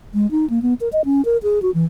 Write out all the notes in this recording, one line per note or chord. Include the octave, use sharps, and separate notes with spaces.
G#3
D#4
A#3
B3
A#4
D#5
C#4
A#4
G#4
F#4
E3